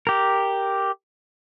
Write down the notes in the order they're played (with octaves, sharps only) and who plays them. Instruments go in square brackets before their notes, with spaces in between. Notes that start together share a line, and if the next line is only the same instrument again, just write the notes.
[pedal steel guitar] G4 A#4